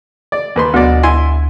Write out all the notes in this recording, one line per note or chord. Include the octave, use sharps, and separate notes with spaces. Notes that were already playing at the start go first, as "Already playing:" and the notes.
D5
D#2 B4 C6
D2 B2 F#3 D5
E4 G#5 C6